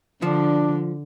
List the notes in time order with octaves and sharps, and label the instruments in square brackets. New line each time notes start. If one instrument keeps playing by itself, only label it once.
[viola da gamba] D3 [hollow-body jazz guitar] F3 [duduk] D4